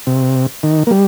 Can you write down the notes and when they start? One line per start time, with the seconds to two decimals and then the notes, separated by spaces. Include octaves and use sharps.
0.07 C3
0.63 D#3
0.87 A#3
0.91 G3